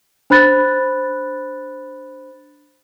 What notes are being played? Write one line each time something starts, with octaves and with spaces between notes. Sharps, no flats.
D4 C5 B5 F#6 A6